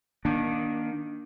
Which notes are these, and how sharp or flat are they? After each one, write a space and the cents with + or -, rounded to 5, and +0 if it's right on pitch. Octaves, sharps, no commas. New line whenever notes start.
D#3 +0 A#3 +30 D4 +0